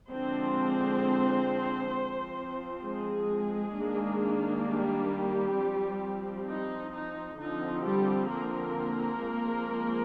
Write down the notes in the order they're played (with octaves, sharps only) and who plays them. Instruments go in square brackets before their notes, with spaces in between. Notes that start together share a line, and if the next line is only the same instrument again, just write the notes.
[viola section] D3 F3 G#3 C4 D4 C5
F3 C4
G#3 G#4
D#3 A#3 D4
G3 G4
F3 C4
D#4
D#4
D3 F3 C4 D#4
G3 G4
A#3 A#4
F3 G#3 C4